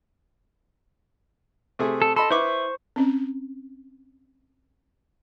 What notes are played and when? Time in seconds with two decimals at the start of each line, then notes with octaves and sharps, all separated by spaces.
1.79 C3 A3 G#4
2.02 A4
2.16 A4 D#5 B5 C6
2.31 E4 B4 C5 C#6 D6
2.96 C4 C#4